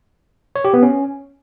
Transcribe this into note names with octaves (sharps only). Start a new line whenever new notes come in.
C#5
G4
B3
C#4